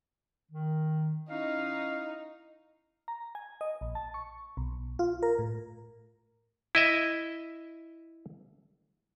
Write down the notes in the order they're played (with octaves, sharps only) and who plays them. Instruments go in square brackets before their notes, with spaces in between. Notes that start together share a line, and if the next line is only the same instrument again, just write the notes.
[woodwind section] D#3
[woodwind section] C#4 E4 F5 [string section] D#4
[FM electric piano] A#5
G#5
D#5
A#1
A5
C#6
B1
F4
A#4
A2
[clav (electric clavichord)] E4 D#5 E5